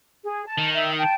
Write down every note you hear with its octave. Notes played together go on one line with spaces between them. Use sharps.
G#4
A5
D#3
E5 G5
G5 A5